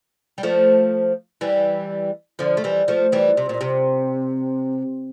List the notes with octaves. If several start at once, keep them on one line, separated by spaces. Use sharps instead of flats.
G3
F3 A3
E3 G3
D3 F3
A3
E3 G3
F3 A3
E3 G3
C3
A#2
C3